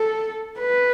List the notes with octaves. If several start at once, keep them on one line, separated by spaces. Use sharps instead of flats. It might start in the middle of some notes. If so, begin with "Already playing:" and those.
Already playing: A4
B4